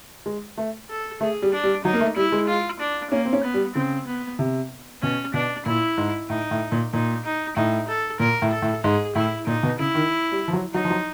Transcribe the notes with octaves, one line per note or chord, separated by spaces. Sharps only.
G#3
A3
A4
A3 G#4
G3
D4
G3
F#3 D#4
A#3
A3
G3 E4
G#3
F4
D4
A#3 C#4
C4
C#4
B3
G3
C#3 C4
B3
C3
B2 C#4
B2 D4
A#2 E4
G#2
A2 D#4
A2
A#2
A#2 D#4
D#4
A2 D#4
A4
A#2 A#4
A2
A4
A2
G#2 G#4
A2 E4
A#2 D#4
B2
C#3 E4
D#3
G3
F3
F#3
F#3 D#4
F3
F#3